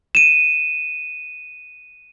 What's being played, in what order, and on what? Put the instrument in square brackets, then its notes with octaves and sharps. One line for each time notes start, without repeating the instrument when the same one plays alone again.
[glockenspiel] D#7 E7